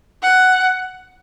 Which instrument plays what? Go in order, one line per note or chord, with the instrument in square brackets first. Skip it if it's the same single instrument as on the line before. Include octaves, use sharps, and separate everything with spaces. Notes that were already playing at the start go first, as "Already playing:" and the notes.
[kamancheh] F#5